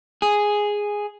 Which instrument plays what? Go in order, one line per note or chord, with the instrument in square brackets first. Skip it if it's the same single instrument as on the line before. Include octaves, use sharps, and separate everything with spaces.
[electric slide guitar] G#4